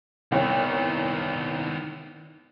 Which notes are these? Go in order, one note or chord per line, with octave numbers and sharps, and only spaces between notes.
C2 D#3 B3 C#5